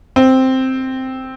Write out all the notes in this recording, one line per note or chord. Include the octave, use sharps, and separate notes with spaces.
C4